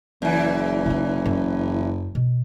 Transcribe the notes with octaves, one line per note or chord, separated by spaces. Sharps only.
F#1 E2 E3
C#3 D#4
F#2
B2